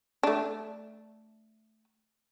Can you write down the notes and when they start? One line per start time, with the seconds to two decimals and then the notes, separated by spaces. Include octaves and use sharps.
0.23 A3 D4